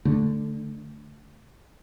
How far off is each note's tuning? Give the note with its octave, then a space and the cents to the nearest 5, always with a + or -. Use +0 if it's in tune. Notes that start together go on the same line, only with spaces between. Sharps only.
D3 +0 A3 +0